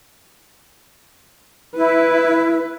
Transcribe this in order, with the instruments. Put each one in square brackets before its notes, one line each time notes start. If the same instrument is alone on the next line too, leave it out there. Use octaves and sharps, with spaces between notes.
[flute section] E4 [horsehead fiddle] B4